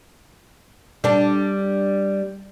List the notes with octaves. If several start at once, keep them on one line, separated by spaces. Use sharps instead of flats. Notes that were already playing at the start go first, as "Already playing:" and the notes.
G3 D4